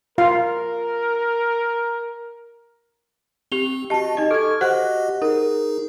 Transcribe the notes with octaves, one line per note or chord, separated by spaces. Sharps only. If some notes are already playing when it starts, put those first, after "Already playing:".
F4 A#4 F5
C4 G4 F7 G7
F#4 G4 D#5 A5
D#4 D#5
A4 C#6 F6 G#6
F#4 G4 C5 D#5 F#5 F#6
D#4 G#4 A#4